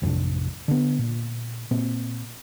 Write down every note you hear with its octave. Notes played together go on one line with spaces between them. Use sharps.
A1 F2 C3 D4
D3 B3
A#2
A#2 C4